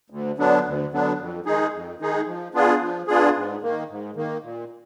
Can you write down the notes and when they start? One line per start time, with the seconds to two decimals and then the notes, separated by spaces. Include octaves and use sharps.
0.10 D2
0.38 D3 F#3 B3 D4
0.65 D2
0.92 D3 F#3 B3 D4
1.18 F2
1.46 D#3 G#3 D#4 G#4
1.73 F2
2.00 D#3 G#3 D#4 G#4
2.27 F3
2.54 B3 D4 F4 G#4
2.81 F3
3.07 B3 D4 F4 G#4
3.35 G#2
3.62 D#3 A#3
3.90 G#2
4.16 D#3 A#3
4.43 A#2